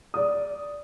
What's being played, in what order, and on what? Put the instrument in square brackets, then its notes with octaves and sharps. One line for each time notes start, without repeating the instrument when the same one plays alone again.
[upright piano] D5 D#6